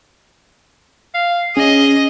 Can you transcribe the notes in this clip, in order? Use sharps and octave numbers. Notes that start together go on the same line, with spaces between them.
F5
C#4 G#4 D#5